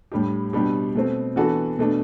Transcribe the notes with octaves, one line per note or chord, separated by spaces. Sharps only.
A2 G3 D4 G4
B2 G3 D4 G4
B2 A3 C4
E3 B3 D4 F#4 A4
B2 A3 D4